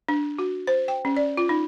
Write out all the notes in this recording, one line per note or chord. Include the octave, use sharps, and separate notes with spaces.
D4
F#4
C5
G5
C#4
D5
F4
D#4